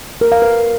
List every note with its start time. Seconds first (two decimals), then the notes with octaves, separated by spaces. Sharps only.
0.21 A#4
0.32 F5
0.42 B4